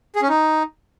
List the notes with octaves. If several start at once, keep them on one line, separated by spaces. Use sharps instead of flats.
G#4
C#4
D#4